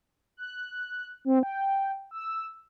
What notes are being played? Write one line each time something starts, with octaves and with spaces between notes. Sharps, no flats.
F#6
C4
G5
E6